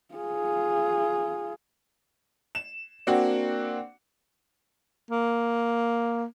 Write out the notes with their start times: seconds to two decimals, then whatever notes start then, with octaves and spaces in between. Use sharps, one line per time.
0.15 F4 G#4
2.55 E7
3.07 A#3 C4 D4 F#4 F#5
5.10 A#3